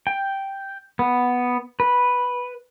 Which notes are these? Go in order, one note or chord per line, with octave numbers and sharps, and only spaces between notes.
G5
B3
B4